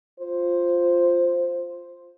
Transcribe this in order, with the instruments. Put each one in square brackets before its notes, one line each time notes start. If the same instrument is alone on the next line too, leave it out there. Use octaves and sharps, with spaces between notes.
[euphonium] F4 [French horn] C5